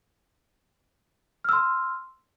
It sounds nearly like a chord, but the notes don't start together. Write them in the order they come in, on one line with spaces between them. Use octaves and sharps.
F6 E6 C6